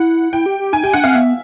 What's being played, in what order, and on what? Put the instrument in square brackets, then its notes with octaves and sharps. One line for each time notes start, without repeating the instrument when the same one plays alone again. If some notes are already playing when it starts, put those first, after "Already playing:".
Already playing: [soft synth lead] E4 [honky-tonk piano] F#5
[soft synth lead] E4 [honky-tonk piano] G5
[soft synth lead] G4
G4
[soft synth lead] D#4 [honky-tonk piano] G#5
[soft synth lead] G4 [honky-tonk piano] G5
[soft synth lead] D4 [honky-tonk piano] F#5
[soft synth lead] C4 [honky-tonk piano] F5
[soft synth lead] B3 [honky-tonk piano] E5